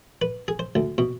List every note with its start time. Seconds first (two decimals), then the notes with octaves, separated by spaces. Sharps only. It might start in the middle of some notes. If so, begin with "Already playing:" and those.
0.22 B4
0.48 G#4
0.59 C5
0.75 D2
0.98 B2